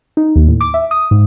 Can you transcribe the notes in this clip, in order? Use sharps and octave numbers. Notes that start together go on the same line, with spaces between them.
D#4
D#2
A2
D6
E5
D#6
G#2